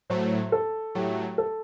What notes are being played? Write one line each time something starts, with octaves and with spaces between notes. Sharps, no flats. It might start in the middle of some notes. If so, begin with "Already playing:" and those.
A2 F#3 A3 C5
A4
A2 F#3 A3 G4
A4